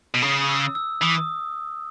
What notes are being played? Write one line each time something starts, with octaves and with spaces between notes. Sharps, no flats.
B2
C#3 D#6
E6
E6
E3 D#6